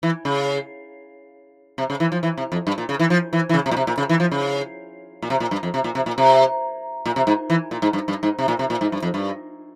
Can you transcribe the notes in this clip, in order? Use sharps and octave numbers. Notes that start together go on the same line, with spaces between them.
E3
C#3
C3
C#3
E3
F3
E3
C3
F2
G2
A#2
C#3
E3
F3
E3
E3
C#3
C3
A#2
C3
A#2
C#3
E3
F3
C#3
A#2
C3
A#2
G2
F2
C3
A#2
C3
A#2
C3
A#2
C3
G#2
E3
A#2
G#2
G2
G2
G#2
C3
A#2
C3
A#2
G#2
G2
F2
G2